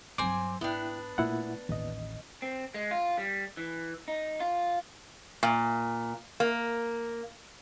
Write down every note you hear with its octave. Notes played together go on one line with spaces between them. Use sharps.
G2 F#3 C4 G#5 D6
G#2 B3 D4 E4 G5
A#2 A3 E4 F#5
A1 D#2 D#5
C4
G#3
F4
G3
E3
D#4
F4
A#2
A#3